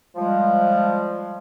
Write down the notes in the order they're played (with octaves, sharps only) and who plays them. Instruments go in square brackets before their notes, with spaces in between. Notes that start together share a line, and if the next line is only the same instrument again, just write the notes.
[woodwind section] F3 G3 G#3